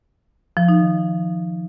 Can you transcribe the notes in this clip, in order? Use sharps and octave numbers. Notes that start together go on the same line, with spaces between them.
F3
D#4
D#3